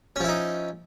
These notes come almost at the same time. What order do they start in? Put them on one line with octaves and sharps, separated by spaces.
C#4 F3 E4 D#4